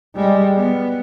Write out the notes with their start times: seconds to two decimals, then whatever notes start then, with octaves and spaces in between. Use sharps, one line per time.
0.15 G3 G#3
0.56 B3